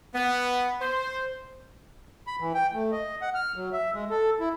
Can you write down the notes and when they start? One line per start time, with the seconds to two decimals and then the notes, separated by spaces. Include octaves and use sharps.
0.14 B3
0.80 C5
2.27 B5
2.40 E3
2.54 G5
2.73 A3
2.92 D#5
3.22 F#5
3.34 F6
3.56 F#3
3.73 E5
3.94 G#3
4.10 A4
4.40 E4